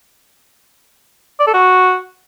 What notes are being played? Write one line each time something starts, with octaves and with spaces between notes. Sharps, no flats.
D5
A4
F#4